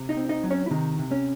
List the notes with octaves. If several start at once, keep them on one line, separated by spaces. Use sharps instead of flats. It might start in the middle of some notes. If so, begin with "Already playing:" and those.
Already playing: C3
D#4 D#5
C4
D#4 D#5
F#3
C#4 C#5
E4
C3 D#3 D#4
C3
C#4